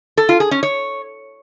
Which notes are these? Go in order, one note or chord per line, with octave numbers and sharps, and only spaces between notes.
A4
F4
G#4
C#4
C#5